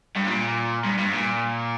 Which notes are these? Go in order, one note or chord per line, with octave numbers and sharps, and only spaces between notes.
G2
A#2
G2
G2
A#2